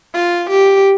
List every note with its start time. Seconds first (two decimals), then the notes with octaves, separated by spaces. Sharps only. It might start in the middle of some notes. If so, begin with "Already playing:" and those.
0.14 F4
0.49 G4